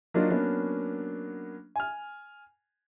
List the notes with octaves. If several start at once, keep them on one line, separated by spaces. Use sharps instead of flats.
F#3 A#3 D4 D#4 F4
F#3 A#3 B3 C#4 D4
G#5 F6